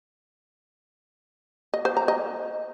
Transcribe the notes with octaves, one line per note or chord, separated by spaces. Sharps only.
D#5
C5
A#5
D#5